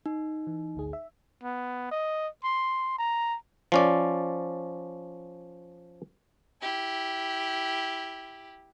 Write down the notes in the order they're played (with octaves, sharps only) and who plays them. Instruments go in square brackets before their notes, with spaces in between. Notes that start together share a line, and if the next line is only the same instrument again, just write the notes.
[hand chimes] D#4
[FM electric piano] E3
G#1 D2 G#4
E5
[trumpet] B3
D#5
C6
A#5
[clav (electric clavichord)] F3 C#4 D5
[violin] E4 G4